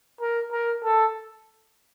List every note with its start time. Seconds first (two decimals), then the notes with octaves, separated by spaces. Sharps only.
0.21 A#4
0.51 A#4
0.83 A4